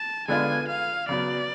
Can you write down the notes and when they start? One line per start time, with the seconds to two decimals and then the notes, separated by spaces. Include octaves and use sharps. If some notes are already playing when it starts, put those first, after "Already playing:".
Already playing: A5
0.28 D3 G#3 B3 D4 F4 G#5
0.68 F5
1.09 C#3 F#3 B3 D5